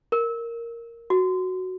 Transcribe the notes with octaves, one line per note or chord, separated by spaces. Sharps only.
A#4
F#4